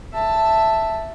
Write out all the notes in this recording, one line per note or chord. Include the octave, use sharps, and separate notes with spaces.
E5 A5